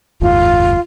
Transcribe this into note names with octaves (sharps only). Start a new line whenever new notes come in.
F#1 D#2 G#2 F4